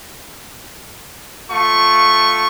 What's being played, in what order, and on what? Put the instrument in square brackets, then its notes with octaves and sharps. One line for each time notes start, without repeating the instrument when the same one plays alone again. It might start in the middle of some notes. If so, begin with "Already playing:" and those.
[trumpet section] A3 F4 C#6